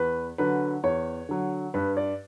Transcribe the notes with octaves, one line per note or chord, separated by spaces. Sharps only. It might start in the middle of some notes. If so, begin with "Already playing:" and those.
Already playing: E2 B4
D3 F#3 B4
E2 C#5
D3 F#3
G2 B4
D5